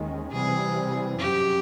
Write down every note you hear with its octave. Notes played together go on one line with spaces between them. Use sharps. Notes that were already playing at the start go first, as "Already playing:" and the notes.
Already playing: D#2 D#3 G#3 C#4
C3 E3 G3 C4 G#4
F#2 C#3 F#3 G4